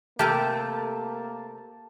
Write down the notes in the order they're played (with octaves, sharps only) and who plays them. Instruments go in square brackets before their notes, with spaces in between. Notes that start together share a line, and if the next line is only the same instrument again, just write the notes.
[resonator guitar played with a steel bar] C3 A3 [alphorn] A#3 [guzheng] G4 A#4 G#5 [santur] A5